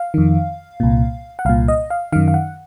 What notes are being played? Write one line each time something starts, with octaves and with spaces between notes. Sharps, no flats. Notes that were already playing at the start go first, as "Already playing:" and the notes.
Already playing: F5
F2 D#3
C2 A#2
F#5
C2 A#2 F5
D#5
F5
F#2 D#3 F5
F5
F#5